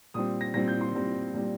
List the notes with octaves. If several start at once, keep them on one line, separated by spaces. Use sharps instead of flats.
A#2 G3 C4 D#6
A#6
A#2 G3 C4 A#6
G6
C6
A#2 G3 C4
A#2 G3 C4